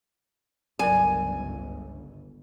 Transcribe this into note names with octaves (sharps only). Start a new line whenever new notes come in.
G1 C#2 F#3 A#4 D5 G#5